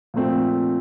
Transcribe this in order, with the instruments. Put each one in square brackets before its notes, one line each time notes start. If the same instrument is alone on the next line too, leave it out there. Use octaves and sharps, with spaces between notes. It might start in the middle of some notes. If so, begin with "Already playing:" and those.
[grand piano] A#2 F3 A3 C4